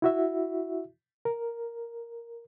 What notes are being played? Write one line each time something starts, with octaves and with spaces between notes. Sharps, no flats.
E4 F#4 E5
A#4